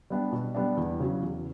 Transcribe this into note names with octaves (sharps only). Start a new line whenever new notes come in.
G3 B3 D4
B2
G3 B3 D4
E2
C#3 F#3
E2